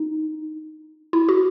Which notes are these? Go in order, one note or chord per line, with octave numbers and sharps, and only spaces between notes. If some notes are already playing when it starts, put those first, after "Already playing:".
Already playing: D#4
E4
F#4